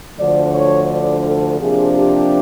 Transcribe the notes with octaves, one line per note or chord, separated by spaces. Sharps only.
D2 D3 F3 D5
C#5
D5
A4
C3 F3 A#3 D4 G#4
G4